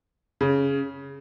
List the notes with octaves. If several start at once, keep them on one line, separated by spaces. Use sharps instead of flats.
C#3